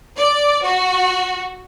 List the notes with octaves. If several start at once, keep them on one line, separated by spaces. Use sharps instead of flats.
D5
F#4